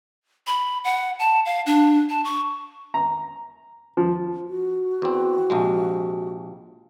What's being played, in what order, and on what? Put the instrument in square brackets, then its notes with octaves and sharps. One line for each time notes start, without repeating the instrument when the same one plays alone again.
[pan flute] B5
F#5
A5
F5
D4
A5
C#6
[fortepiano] A#5
F3
[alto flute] F#4
[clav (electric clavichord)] E2 C4
A#1 C3 G#3